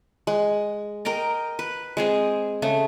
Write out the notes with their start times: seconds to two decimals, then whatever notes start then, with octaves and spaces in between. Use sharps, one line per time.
0.27 G#3
1.05 A#4 D#5 G5 A#5
1.59 B4
1.97 G#3 C4 G#4
2.62 C#3 A3